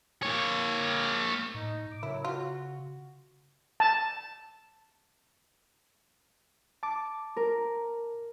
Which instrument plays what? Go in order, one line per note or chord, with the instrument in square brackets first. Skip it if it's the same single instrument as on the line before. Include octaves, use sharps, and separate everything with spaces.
[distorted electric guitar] A#3 C#5
[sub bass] A2 [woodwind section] D#4
[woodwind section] D6
[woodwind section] F#2 F#3 [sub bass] C#3 [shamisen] E4
[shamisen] F4 [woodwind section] F#4
[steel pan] A5
[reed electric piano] A5 D6
[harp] A#4